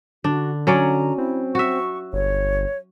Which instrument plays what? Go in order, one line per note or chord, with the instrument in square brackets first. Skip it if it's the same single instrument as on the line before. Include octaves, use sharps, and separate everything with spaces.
[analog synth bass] D3 [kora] D4 [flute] F#4
[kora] F#3 C#4 D5 [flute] A#5
[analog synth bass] C4 [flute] E4
[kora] F#4 E5 [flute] C#6
[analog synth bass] G1 [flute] C#5